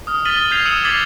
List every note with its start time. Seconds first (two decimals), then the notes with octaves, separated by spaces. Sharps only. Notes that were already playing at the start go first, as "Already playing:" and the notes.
0.07 D#6 F6
0.25 F6 A6 B6 D#7 F#7 G7
0.37 D#6
0.51 F6 G6 G#6 B6 C7 F7
0.65 D#6 E6 C#7 D#7 E7 F#7
0.84 D6 G#6 A6 B6 C7 F#7